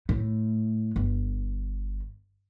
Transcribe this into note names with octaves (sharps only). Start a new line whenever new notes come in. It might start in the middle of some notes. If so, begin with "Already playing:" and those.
A2
G1